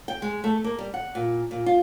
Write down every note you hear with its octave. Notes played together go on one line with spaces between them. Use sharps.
G5
G#3
A3
A#3
G3
F#5
A#2
A#2
F4